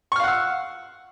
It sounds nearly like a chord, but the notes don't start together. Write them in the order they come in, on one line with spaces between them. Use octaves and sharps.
C#6 F6 F5 F#5 E6